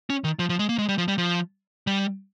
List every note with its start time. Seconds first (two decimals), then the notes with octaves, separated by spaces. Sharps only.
0.10 C#4
0.24 D#3
0.39 F3
0.50 F3
0.59 G#3
0.69 A#3
0.79 G#3
0.89 G3
0.98 F3
1.08 G3
1.18 F3
1.87 G3